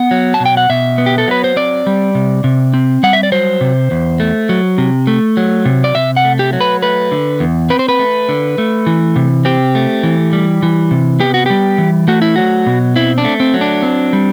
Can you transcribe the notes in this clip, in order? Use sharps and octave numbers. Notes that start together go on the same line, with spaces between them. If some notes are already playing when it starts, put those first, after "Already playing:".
Already playing: B3 F#5
F#3
A5
B2
G5
F#5
B2 E5
B3
G4
A4
F#3 B4
C5
C4 D5
G3
C3
C3
C4
G3 F#5
E5
D5
F#3 C5
C3
E2
A3
F#3
C3
A3
F#3
C3
D5
C3 E5
F#5
A3
G4
F#3
B4
A3 B4
D3
E2
C4 B4
C5
B4
A3
D3
A3
E3
C3
C4 G4
A3
E3
G3
E3
C3
B3 G4
F#4
G3 G4
E3
A3 F#4
E4
F#3 F#4
B2
C4 E4
D4
A3
C4
F#3
D4
C4
G3